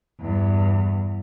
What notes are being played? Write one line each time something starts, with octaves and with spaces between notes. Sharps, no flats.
E2 G2